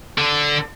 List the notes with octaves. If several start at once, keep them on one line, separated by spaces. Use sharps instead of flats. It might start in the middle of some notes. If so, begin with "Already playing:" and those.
D3